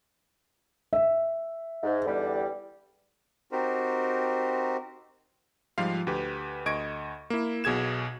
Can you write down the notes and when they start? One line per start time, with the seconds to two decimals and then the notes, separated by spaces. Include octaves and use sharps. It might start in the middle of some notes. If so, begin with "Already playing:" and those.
0.93 E5
1.83 G#2
2.06 E2 D3 G3
3.52 C4 D#4 F#4 G4 A#4 C5
5.78 G#2 F3 G3 F4 F5
6.07 D2 G4 B4
6.66 D2 D#5 C#6 G#6 D7
7.30 A#3 E4
7.64 B1 B2 G#4 G#6 E7